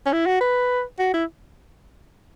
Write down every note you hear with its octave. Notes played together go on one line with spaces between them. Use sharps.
C#4
E4
F#4
B4
F#4
E4